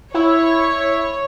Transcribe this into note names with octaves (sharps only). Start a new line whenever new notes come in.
E4 C#5